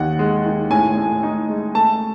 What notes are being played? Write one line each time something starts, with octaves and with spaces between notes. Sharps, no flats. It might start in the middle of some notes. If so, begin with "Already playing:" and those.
Already playing: D#2 D#4 F#5
G#3
D#3
A2 G#5
A2
D#4
G#3
A3 A5